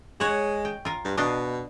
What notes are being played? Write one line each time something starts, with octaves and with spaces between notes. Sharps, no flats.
G#3 C#5 F#5
G5
F4 A#4
G2
B2 D4 D#5 F5